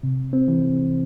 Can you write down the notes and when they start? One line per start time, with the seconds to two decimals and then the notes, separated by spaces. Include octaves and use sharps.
0.03 C3
0.33 C4
0.48 E3